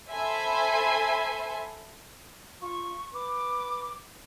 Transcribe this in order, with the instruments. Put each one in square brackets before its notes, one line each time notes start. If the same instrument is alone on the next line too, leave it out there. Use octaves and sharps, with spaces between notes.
[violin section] A4 C5 E5 G#5 B5 C6
[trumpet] F4 [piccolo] C#6
[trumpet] B4 [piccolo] D6